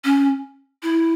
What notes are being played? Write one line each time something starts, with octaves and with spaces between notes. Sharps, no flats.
C#4
E4